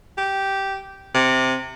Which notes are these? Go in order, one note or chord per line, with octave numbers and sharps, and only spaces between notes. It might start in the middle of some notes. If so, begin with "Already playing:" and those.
G4
C3